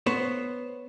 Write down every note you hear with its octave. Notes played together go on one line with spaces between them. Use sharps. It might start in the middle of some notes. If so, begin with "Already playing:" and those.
B3 C5 C#5